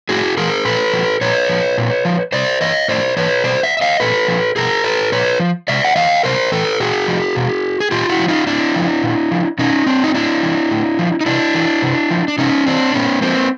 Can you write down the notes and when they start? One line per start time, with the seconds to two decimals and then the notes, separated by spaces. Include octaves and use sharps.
0.09 A2 F#4 G#4
0.37 E3 G#4 A#4
0.65 A#2 A4 B4
0.93 F3
1.21 A#2 B4 C#5
1.49 F3
1.78 A#2
2.05 F3
2.32 C3 C5 D5
2.61 E3 C#5 D#5
2.88 A2 C5 D5
3.17 E3 B4 C#5
3.44 B2 C5 D5
3.63 D5 E5
3.77 E5
3.81 D#5 F5
4.00 A#2 A4 B4
4.28 F3
4.56 B2 G#4 A#4
4.84 A4 B4
5.12 A#2 B4 C#5
5.40 F3
5.68 C3 D5 E5
5.85 F#5
5.96 E3 D#5 F5
6.23 C3 A#4 C5
6.52 E3 A4 B4
6.80 A#2 F#4 G#4
7.07 F3
7.36 B2
7.80 G#4
7.91 A#2 F4 G4
8.09 E4 F#4
8.19 F3
8.28 D#4 F4
8.47 A2 D4 E4
8.76 F3
9.03 A#2
9.31 F3
9.58 B2 C#4 D#4
9.86 C4 D4
10.04 D#4
10.14 A2 D4 E4
10.43 E3
10.71 A2
10.99 F3
11.21 D#4
11.26 C3 D4 E4
11.55 E3
11.82 C3
12.10 F3
12.28 D4
12.38 C3 C#4 D#4
12.66 E3 C4 D4
12.94 A#2 B3 C#4
13.22 F3 A#3 C4